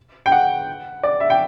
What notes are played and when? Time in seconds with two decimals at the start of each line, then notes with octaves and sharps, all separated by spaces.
0.26 G5
0.32 F#5
1.03 D5
1.20 E5
1.30 G5